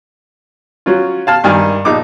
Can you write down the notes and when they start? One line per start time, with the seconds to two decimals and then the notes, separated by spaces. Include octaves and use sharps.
0.86 F#3 C#4 F4
1.27 F5 A5 F6
1.44 G2 D#3 A#4 G#5
1.85 A#1 D#4 D6